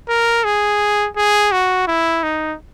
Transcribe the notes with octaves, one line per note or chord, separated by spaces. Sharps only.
A#4
G#4
G#4
F#4
E4
D#4